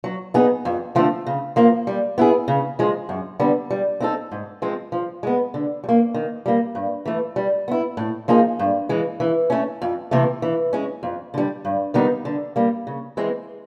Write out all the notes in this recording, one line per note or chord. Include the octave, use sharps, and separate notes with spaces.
F#3
B3 D#4 G#4
F2
D3 F3 A3 C4
C#3
F3 A#3
G3
B3 E4 G#4
C#3
F3 G#3
F#2
D3 G3 B3
G3
C4 D#4 F#4 A4
G#2
F3 G#3 C4
F3
G#3 B3
D3
G3
A#3
D#3
G3 A#3
G2
E3 A3
G3
B3 E4
A2
F3 A#3 D#4 G#4
G2
E3 G#3
E3
A3 C#4
F2
C3 E3 A3
E3
G#3 C#4
F2
D3 G3
G2
D#3 G3 B3 D#4
D3
G3 A#3
C#3
E3 G#3 C4